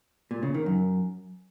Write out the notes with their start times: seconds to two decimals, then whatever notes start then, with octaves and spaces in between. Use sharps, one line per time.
0.31 A#2
0.43 C#3
0.54 D#3
0.66 F#2